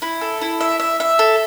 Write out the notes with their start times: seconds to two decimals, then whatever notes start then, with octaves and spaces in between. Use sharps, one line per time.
0.02 E4
0.21 A4
0.41 E4
0.61 E5
0.80 E5
1.00 E5
1.19 A4